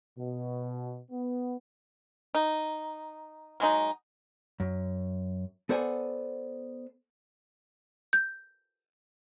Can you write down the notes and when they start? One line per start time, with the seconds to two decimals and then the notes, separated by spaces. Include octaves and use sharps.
0.18 B2
1.11 B3
2.35 D#4
3.60 F#3 G#3 D#4
4.60 F#2
5.69 B3 A4 C5 D5 F#5 G#5
8.13 G6